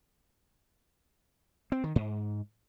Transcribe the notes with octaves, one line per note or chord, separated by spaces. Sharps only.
C4
D#3
G#2